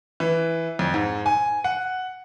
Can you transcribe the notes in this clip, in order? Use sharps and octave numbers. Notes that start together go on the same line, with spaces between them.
E3
F2
G#2
G#5
F#5